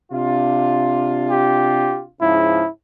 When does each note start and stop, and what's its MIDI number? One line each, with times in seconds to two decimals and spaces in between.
0.12 2.10 48
0.12 2.10 62
0.12 2.10 65
1.30 2.03 67
2.21 2.64 44
2.21 2.64 49
2.21 2.64 53
2.21 2.70 64